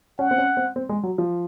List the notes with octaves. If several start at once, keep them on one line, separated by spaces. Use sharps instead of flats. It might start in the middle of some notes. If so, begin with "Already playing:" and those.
C#4 F#5
C4
C#4
C4
C4
G#3
F#3
F3